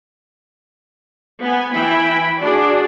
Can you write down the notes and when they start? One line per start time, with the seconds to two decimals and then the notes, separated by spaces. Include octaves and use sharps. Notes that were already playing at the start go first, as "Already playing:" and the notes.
1.40 B3 G#5
1.71 E3 E4 G5 B5
2.39 D4 F#4 G#4 D5